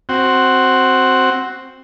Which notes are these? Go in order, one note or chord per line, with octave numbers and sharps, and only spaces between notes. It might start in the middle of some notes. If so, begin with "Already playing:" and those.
C4 F#4